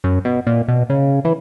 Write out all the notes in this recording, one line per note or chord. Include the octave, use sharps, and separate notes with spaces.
F#2
B2
A#2
B2
C#3
E3